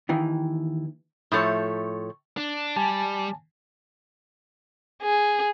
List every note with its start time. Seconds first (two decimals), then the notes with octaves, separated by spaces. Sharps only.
0.09 D#2 D#3 E3
1.32 A2 F3 A3 C#5
2.37 D4
2.76 G3 G#5 A5
5.02 G#4